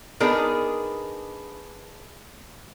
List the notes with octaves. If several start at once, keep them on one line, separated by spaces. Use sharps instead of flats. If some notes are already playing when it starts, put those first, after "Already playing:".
B3 D4 D#4 G#4 A#4 B4